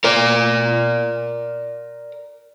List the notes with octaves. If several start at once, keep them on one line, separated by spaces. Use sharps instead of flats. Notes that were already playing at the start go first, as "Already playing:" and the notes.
A#4 D5